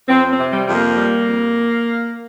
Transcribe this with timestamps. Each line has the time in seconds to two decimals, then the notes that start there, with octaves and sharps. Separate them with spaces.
0.07 F2 C4
0.30 C4
0.37 C3
0.51 G3
0.66 F2 G3
0.73 A#3
0.96 G3
1.25 F2